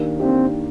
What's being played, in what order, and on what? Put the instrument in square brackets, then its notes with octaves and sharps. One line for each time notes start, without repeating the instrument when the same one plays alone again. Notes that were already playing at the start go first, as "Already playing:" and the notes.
Already playing: [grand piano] D#3 A#3 D4 G4
[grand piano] D#3 A#3 D4 G4 [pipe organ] C4